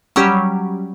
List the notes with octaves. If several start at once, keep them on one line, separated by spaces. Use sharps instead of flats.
F#3 G3 C#4 G4